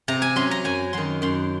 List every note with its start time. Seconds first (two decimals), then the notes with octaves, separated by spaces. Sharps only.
0.08 C3 A#5
0.22 G#5
0.36 F#3 C#4 C6
0.51 A#5
0.64 F#2 G#5
0.93 D#3 F#3 C6
1.22 F#2 C6